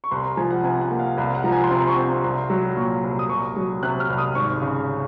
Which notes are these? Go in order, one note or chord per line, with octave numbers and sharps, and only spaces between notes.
C#6
C2 C6
A#5
F3 G#5
F#5
C3 G#5
F#5
A#3
F5
C2 F5
F#5
F3 A#5
G#5
C6
C3 A#5
C#6
C4
C6
C2 C6
F#3
A#2 C#6
C2
D#6
C2 C#6
F#3
C3 F#6
F6
C2
D#6
G#1 C#6
C#3